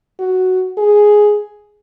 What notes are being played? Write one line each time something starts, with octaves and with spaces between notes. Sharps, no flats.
F#4
G#4